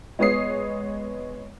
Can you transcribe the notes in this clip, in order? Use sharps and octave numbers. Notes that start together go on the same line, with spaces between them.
G#3 B3 C#5 D#6 C7